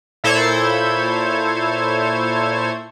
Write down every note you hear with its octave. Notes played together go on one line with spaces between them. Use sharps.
A#2 E4 A4 C5 C#5 G#6